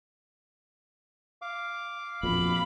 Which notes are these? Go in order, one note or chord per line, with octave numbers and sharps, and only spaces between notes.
F5 D6
A#1 F2 B2 B5